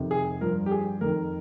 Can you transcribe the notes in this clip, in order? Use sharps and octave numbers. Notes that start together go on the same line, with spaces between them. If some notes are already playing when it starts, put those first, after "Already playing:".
Already playing: F2 C3 D#3
G#4
G2 F3 A#4
G4
G#4
F2 D#3 A#4